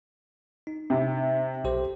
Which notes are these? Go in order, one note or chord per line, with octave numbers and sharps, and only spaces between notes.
D#4
C3
B1 G4 C5